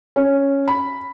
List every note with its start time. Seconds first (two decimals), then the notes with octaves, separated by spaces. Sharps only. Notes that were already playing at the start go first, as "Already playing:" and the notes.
0.16 C#4
0.68 B5